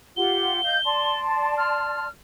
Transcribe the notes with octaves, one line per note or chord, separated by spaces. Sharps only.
F4 G4 F#5 G7
D#5 F5 G6
D5 A5 C6
F6